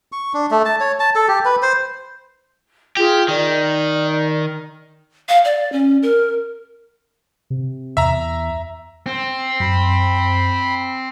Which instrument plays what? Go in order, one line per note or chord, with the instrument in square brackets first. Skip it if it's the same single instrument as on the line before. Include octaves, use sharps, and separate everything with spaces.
[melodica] C#6
D4
A3
A5
C#5
A5
A4
G4
B4
C5
[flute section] F4 G#4 [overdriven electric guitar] G4
[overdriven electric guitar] D#3 [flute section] D5
[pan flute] F5
D5
C#4
A#4
[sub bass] C3
[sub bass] E2 [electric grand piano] E5 A#5
[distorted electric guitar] C4
[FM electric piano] F#2 [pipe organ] B5